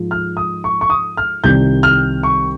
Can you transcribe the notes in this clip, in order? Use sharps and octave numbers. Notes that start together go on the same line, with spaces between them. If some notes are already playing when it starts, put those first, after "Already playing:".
Already playing: G#2 F3 G#3
F6
D#6
C#6
C#6
D#6
F6
C2 C3 D#3 G3 G6
F6
C#6